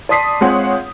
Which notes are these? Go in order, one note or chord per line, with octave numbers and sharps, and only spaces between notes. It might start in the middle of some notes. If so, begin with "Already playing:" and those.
D5 A5 C6 D#6 B6 C7
G#3 C4 F4 G#4 C#5 F#5